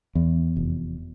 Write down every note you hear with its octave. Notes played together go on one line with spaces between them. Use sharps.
E2
F1